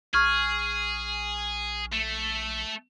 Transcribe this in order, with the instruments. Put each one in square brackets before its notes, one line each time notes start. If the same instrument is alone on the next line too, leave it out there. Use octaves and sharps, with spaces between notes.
[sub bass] A#1 [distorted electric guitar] G#4 [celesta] C#6 F6 G#6
[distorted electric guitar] A3